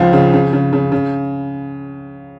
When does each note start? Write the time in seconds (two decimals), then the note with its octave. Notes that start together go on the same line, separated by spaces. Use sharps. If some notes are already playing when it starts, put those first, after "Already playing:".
Already playing: C#2 F3 F5
0.13 C#3
0.33 C#3
0.53 C#3
0.73 C#3
0.92 C#3